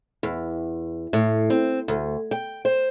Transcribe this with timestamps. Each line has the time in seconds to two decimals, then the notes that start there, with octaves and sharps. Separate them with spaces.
0.23 E2
1.13 A2
1.50 C4
1.88 D2
2.31 G5
2.65 C5